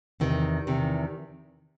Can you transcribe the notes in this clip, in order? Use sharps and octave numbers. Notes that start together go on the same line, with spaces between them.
E2 C3 D#3
E2 C3 D#3